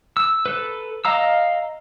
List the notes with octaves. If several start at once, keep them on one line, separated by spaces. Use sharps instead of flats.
E6
A4 B4
D#5 F5 A#5 E6